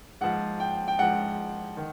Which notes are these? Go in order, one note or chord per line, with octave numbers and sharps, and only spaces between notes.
G#2 F3 F#5
G5
G5
G#2 F3 F#5
D#3